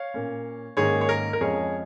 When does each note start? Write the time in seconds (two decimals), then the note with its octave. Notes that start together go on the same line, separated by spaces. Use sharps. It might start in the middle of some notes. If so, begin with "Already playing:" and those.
Already playing: C#5 F5
0.14 A#2 A#3 C#4
0.77 G#2 D#3 A#3 C#4 G#4 C#5
1.01 C#5
1.09 A#4
1.33 A#4
1.41 F2 F3 G#3 C#4 G#4 C#5